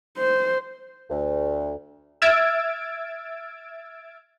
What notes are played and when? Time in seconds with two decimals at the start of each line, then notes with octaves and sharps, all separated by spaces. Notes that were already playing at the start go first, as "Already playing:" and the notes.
0.18 C5
1.10 D2
2.22 E5 E6 F6 G#6 A6 D7